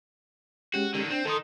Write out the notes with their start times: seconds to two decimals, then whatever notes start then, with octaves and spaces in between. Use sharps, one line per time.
0.74 G#3 C#4 F#4 G4
0.94 D3 D#3
1.10 C4 D4
1.25 D#3 D#4 A4 C6 D#6